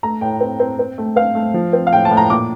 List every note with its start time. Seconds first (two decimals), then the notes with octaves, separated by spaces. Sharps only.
0.03 A3 A#5
0.21 A2 G5
0.40 C4
0.60 C4
0.79 C4
0.98 A3
1.16 C4 F5
1.35 A3
1.54 F3
1.73 C4
1.87 F5
1.93 A2 G5
2.05 A5
2.11 A2
2.17 A#5
2.30 A#2 D6